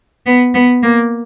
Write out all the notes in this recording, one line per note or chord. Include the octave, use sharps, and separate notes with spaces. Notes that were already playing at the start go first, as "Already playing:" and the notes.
B3
B3
A#3